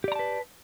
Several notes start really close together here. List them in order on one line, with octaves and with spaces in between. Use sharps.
G4 D5 A#5 A5 B4